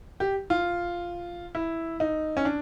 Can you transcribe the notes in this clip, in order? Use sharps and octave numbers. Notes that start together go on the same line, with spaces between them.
G4
F4
E4
D#4
C#4
D4